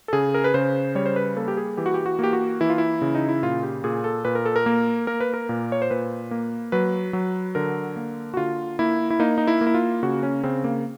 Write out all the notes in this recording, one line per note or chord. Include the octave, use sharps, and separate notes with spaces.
A4
C#3 G#4
A#4
B4
C#3 C5
G3 C#5
C5
B4
A#3 A4
G4
G#4
E3 G4
F#4
G4
F#4
A#3 G4
F#4
E3 E4
F4
E4
C#3
D#4
E4
A#2 F4
G4
A#2 G#4
A4
A#2 B4
A#4
A4
A#4
A#3
A#3 A#4
B4
A#4
A#2
C#5
C5
A#2 B4
A#3
F#3 B4
F#3
D3 A#4
A#3
F#4
D3 F4
A#3 E4
E4
A#3 D#4
D#4
E4
A#3
E4
F4
C#3 F#4
C#4
C#3 C4
A#3